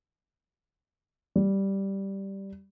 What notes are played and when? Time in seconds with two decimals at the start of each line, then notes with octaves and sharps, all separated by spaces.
1.36 G3